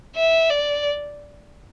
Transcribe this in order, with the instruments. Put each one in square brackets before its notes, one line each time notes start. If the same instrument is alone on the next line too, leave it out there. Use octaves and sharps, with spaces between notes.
[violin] E5
D5